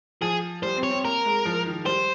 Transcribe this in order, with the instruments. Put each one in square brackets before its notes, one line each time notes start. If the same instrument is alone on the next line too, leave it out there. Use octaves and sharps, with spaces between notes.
[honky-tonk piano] F3 [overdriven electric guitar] G#4
[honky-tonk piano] G3 [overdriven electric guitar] C5
[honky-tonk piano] C4
[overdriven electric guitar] C#5
[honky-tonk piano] C4
[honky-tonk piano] A#3 [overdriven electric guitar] A#4
[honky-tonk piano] G#3
F3
D#3
[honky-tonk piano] G3 [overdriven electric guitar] C5